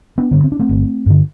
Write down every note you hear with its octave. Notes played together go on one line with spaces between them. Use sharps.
B3 D4
G2 D3
C4
D4
A3 C4
G1
G2 D3